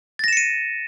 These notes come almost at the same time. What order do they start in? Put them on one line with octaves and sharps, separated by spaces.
A6 A#6 E7 C#7 D#7